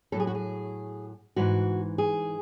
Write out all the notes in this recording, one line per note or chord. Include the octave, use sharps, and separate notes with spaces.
A2 F#3 A4
G#4
F#4
G#4
G#2 E3 F#4
G#4